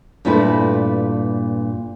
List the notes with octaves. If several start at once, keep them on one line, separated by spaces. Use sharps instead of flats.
G2 A#2 A3 E4 B4